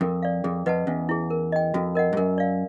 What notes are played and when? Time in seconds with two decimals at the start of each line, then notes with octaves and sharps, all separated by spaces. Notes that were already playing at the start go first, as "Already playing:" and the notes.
0.01 F2 A#4
0.22 D5 F5
0.44 F2 G#4
0.66 F2 B4 D#5 F#5 A5
0.87 E2 C#4
1.09 E4 G#4
1.30 A#4
1.52 D#5 G5
1.74 F2 F#4
1.95 A#4 D#5 F#5
2.13 G2
2.17 F#2 A#4
2.38 D5 F5